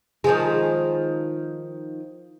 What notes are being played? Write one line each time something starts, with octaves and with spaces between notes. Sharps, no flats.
D#3 F3 G#3